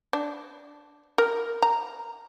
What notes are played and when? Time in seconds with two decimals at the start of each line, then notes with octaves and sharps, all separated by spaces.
0.13 D4
1.18 A#4
1.62 A#5